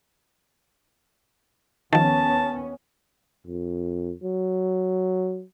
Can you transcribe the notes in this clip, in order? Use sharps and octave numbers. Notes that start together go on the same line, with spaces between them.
D#2 D#3 F3 B3 C#4 A5
F2
F#3